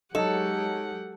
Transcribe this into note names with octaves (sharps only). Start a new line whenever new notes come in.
F#3 G#3 D#4 G4 A4 C#5 D#5 F#5